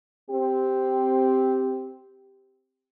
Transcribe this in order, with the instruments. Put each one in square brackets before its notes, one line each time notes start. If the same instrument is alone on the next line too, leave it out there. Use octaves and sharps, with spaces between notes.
[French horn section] C4 G4